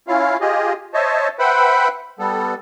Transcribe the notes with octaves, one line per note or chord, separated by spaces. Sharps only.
C#4 E4 F4 F5
F4 G4 G#4 D#5
C5 C#5 D#5 E5 A5
B4 C5 E5 F#5 G5 B5
G3 B3 A4